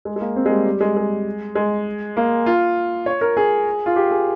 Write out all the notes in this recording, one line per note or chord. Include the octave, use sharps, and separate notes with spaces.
G#3
G#3
A#3
C4
G#3
G3
G3
G#3
G#3
G#3
A#3
F4
C#5
A#4
G#4
F4
G4
G#4